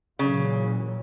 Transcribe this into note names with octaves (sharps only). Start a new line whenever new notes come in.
A#2 C#3 E3 F#3